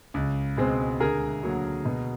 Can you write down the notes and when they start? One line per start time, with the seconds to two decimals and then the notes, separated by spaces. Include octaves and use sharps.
0.14 C#2
0.57 B2 G#3 C4
1.00 D2 G#4 A#4
1.43 D3 F#3 A#3
1.85 B2